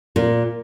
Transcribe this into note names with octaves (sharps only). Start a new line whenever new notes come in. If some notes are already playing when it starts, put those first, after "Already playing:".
A#2